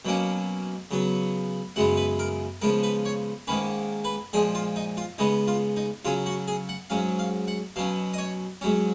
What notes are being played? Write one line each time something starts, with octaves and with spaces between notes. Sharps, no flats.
B2 F#3 A#3 C#4
C#3 F#3 B3
F#2 C#3 G#3 B3 F#5
B4
A#4
C#3 F3 G#3 B3 A#4
B4
C#5
G#2 D#3 A#3 C#4 B4
B4
A#2 F3 G#3 G#4
F4
D#4
F4
C#3 G#3 B3 D#4
F4
D#4
C#3 F#3 C#4 F4
F#4
G#4
F#5
G#2 F#3 C#4 F5
F5
F#5
B2 F#3 C#4 F5
D#5
C#5
G#2 F#3 C#4